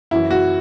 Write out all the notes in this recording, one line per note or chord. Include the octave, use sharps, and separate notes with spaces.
F#2 E3 E4
F#4